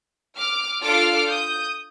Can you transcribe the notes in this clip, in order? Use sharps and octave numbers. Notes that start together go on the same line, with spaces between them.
D6 F6
D4 F4 A4 D6 F6
D#6 G6